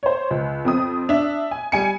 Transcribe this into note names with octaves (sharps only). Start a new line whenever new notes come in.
C5 C#5
C#2
F2 C4 D#6
D4 E5
G#5
G3 G#5 C#7